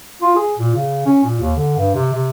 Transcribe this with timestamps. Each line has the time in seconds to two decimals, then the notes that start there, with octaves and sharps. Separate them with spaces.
0.22 F4
0.36 G#4
0.58 A#2
0.75 C#3
1.06 C#4
1.24 A#2
1.40 D#2
1.57 D3
1.77 G2
1.94 C3
2.13 C3